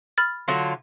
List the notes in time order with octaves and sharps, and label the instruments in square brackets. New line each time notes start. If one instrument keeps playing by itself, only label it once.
[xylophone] B5 F6 A6
[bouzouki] D3 F#3 F4